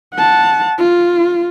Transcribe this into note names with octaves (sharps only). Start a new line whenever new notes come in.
F#5 A5
F4